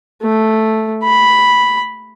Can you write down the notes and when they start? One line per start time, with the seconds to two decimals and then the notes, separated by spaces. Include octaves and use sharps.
0.22 A3
1.03 B5